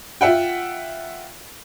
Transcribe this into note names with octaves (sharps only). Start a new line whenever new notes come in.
F4 E5 F#5 G5